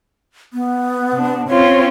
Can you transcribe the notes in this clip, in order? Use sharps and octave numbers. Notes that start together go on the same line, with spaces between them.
B3
C3 D4
C4 C#4 F4 C#5